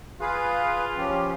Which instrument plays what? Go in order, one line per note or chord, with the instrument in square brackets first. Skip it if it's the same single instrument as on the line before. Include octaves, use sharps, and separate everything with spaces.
[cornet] F4 [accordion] G#4 B4 F5
[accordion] F3 C#4 G4